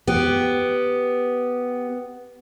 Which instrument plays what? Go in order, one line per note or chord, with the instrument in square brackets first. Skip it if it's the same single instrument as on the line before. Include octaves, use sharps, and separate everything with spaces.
[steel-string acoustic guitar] B3 G4